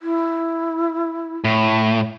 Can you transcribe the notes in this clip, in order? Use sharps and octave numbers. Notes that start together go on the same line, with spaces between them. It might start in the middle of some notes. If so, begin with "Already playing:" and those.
E4
A2